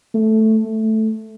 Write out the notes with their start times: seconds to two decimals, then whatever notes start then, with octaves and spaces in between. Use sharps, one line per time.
0.14 A3
0.65 A3